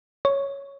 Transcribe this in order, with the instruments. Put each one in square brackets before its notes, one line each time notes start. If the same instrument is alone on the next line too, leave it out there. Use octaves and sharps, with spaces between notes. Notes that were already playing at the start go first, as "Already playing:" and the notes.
[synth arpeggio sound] C#5